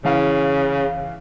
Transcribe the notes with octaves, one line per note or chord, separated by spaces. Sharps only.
C#3 E3 F5